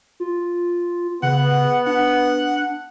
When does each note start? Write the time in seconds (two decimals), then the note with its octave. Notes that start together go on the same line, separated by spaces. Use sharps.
0.20 F4
1.23 C#3 B3 F#5
1.86 D4 F#5